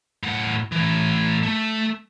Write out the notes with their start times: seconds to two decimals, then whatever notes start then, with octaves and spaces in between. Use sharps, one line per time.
0.23 A2 F#5
0.72 A2 E3
1.43 A3